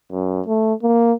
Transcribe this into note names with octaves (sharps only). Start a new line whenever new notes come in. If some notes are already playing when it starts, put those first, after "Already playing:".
F#2
A3
A#3